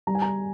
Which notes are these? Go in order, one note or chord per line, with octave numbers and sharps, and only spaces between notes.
G3 A#5
G#5
A#5